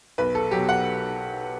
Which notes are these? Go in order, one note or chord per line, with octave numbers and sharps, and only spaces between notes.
B1 B4
A4
B2 F#3 G4
F#5